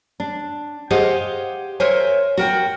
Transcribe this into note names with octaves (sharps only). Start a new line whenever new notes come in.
D4
G4 G#4 C5 D#5 F5 F#5
A#4 C5 C#5 E5 G#5
F#4 A#4 G5